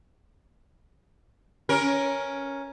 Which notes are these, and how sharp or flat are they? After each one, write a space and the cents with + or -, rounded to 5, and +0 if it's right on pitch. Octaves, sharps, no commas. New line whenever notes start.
C#4 +0 A#4 +10